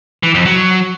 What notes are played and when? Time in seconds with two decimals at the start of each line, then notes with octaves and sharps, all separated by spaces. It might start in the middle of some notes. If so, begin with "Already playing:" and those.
0.23 E3
0.34 F2
0.46 F#3